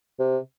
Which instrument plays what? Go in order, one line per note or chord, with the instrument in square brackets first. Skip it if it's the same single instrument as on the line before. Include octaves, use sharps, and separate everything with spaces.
[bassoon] C3